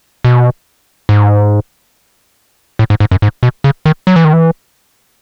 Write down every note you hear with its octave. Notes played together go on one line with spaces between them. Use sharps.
B2
G#2
A2
G#2
G#2
F#2
G#2
B2
C#3
D#3
F#3
E3
D#3
E3